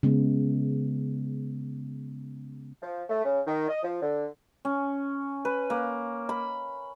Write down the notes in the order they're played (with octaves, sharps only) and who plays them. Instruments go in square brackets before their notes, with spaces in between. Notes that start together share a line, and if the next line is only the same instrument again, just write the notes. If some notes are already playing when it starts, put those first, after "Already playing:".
[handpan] C#3 G#3 B3
[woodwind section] F3
A3
C#3
D#3
D#5
F3
D3
[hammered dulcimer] C#4
B4
A#3
B5